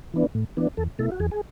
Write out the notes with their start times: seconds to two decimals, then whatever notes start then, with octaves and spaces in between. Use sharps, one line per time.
0.14 E3 B3 D4
0.35 A2
0.57 E3 B3 D4
0.77 E2 A4
0.99 B2 A3 E4 A4
1.12 F#4
1.20 E2 G#4
1.31 G#4